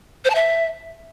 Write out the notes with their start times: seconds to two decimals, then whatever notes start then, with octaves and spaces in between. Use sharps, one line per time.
0.25 C5
0.30 A5
0.35 E5